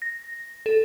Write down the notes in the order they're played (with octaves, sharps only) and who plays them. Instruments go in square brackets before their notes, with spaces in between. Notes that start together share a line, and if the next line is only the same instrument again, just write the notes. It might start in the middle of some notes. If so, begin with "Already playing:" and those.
[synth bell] A#6
A4